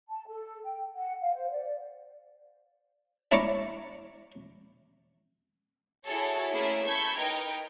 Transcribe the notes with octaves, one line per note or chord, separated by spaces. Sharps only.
A5
A4
G5
F#5
F5
C5
D5
D4 E4 C#5 A#5 C#6 D6
E4 F#4 G#4 A4 C#5
A3 A#3 C#4 E4 G#4
A5 B5 C#6 E6 G6 G#6
D#4 A#4 B4 D#5 G5